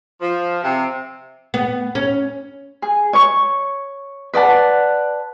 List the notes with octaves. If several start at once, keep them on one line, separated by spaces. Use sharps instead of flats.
F3
C3
B3
C#4
G#4
C#5 C#6
B4 D5 F#5 A5